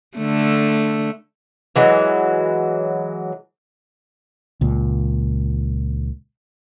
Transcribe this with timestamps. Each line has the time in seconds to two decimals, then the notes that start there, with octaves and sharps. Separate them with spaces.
0.18 D3 A3
1.76 E3 F#3 G#3
4.61 C#2 A#2